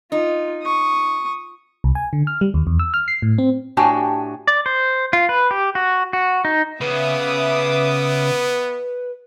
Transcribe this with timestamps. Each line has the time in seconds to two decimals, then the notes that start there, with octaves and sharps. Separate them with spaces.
0.12 D#4 F4
0.63 C#6 D#6
1.84 C2
1.95 G#5
2.13 D3
2.27 F6
2.41 G3
2.54 D#2
2.67 E2
2.79 E6
2.94 F6
3.08 C7
3.22 A2
3.38 C4
3.77 A2 D4 F#4 G4 G5 G#5
4.47 D5
4.66 C5
5.13 F4
5.29 B4
5.51 G4
5.75 F#4
6.13 F#4
6.45 D#4
6.81 C#3 B3 B4 E5 D6 D#6